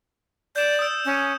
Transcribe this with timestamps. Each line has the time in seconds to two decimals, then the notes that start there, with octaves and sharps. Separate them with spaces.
0.56 D5 G6 E7
0.79 D#6 E6
1.05 C#4